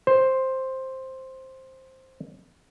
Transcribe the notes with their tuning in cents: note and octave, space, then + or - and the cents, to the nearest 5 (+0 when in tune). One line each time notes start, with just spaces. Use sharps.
C5 +5